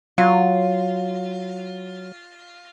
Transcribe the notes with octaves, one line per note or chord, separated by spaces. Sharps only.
F#3 F4